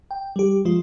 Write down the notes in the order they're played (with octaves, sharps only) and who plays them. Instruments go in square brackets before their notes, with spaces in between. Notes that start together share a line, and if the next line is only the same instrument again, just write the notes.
[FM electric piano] G5
G3 G4
F3 G#3 F4